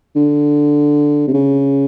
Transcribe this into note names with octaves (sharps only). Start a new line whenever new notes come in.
D3
C3
C#3